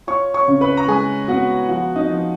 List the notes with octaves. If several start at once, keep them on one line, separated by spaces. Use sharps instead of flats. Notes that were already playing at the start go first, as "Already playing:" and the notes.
F4 C#5 C#6
C#5 C#6
C#3
B4 B5
A#5
G#3 G#4 G#5
B3 F#4 F#5
F3 F#4 F#5
D#4 D#5
F3